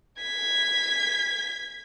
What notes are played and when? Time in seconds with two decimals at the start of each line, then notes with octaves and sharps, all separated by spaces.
0.22 G#6 B6